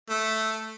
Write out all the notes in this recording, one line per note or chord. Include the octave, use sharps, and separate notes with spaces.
A3